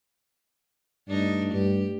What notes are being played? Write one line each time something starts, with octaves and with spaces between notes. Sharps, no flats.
G2 A3 D4 D#4
G2 G4